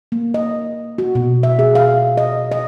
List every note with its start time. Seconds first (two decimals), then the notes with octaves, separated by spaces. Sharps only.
0.12 A#3
0.34 D#5
0.98 F#4
1.15 B2
1.43 E5
1.59 G#4
1.75 F5
2.17 D#5
2.52 D#5